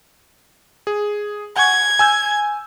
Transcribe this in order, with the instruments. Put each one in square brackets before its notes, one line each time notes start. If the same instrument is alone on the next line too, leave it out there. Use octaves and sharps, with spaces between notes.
[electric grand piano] G#4
[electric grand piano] F#5 G#5 C#6 [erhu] G#6
[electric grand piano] G#5 E6 G6